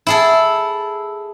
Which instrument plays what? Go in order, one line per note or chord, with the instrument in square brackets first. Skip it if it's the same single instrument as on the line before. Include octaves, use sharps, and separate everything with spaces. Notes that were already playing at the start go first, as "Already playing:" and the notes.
[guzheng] E4 G#4 A4